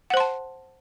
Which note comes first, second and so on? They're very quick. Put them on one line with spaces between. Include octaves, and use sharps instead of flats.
F#5 C5 C6 A5